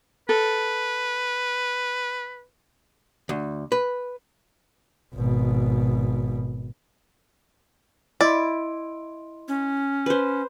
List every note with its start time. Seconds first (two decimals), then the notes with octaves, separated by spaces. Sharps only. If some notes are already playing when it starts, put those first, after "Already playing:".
0.29 A4 B4
3.29 D2
3.72 B4
5.14 G#1 B2
8.21 E4 D5 D#5 C6
9.48 C#4
10.06 B4 C5